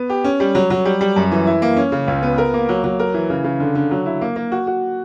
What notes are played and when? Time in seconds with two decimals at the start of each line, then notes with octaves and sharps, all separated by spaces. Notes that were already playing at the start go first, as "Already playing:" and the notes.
Already playing: B3
0.10 G4
0.24 C#4
0.40 G3
0.55 F#3
0.70 F#3
0.85 G3
1.01 G3
1.16 F#2
1.32 E3
1.47 E4
1.62 A#3
1.77 C#4
1.92 C#3
2.08 C#2
2.23 B3
2.38 A#4
2.54 A#3
2.69 F#3
2.84 F#3
2.99 A#4
3.14 E3
3.30 C#3
3.44 C#3
3.60 D3
3.75 D3
3.91 F#3
4.06 E4
4.21 A#3
4.36 A#3
4.52 F#4
4.67 F#4